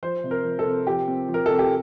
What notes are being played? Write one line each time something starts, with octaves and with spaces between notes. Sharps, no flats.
F3 C5
C3
A#4
F3
A4
C3
F3 G4
C4
F3
A#4
C3 A4
G4